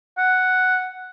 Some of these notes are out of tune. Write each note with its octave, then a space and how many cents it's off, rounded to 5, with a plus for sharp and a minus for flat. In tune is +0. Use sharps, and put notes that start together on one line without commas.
F#5 +0